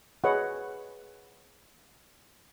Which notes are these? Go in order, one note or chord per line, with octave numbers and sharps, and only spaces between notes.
G#4 B4 C#5 D#5 F#5